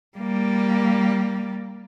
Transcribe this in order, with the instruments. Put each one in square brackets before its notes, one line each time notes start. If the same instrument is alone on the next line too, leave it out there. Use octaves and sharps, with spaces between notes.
[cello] G3 A#3